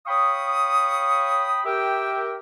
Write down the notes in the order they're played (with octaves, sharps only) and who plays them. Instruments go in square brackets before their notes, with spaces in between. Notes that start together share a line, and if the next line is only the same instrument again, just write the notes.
[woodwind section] C#5 F5 G5 B5 C#6 D#6
G4 A#4 E5 G5